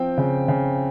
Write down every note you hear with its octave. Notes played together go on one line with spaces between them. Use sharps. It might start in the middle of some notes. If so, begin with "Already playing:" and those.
Already playing: F3 C4 G5
C#3
C#3